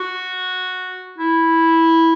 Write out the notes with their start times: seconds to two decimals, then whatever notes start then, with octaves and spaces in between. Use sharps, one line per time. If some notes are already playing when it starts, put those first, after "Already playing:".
Already playing: F#4
1.18 E4